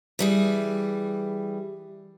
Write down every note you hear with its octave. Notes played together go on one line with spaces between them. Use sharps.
E3 G3 G#4